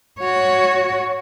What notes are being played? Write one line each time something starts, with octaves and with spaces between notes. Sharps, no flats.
F#4 C#5